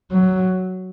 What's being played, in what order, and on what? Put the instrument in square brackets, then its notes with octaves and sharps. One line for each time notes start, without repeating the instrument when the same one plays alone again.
[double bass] F#3